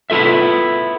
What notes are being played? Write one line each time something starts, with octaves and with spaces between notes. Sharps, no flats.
B3 E4 F4 A4 E5